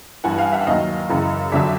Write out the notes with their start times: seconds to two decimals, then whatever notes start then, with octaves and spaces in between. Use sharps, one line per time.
0.24 G2 E3 F#5 G#5
0.38 F5 G5
0.52 E5 F#5
0.66 D#2 D#3 F#3 D#5 F5
1.09 F#2 C#3 E3
1.52 F2 D3 F#3 D5 E5